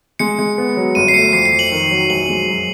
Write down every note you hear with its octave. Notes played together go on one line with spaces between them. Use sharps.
G#3 C#7
G#3
B3
F#3
G1 D#7
C7
A3 C#7
F2 C7
C7
F2
F#7
D#3
F#3
A#1 F#7
G#3
F#2